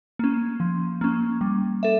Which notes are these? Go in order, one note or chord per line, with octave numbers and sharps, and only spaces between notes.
A#3 C#4
F3
A#3 C#4
G3
A4 E5